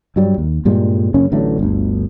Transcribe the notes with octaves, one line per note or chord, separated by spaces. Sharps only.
G2 F#3 G3
D#2
G2 A#2 G3 G#3
F#2 C#3 A#3 C#4
A1 D3 F#3 A3
G1 D2